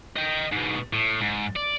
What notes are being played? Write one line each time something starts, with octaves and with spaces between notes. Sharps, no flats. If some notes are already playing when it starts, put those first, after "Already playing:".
D#5 G5
G#2 B2
A2
G#2
D5